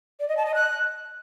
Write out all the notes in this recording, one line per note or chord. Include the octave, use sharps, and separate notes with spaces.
D5
D#5
A5
D#5
F#6